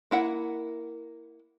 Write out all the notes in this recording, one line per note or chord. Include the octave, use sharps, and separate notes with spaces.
A#3 E4 F#5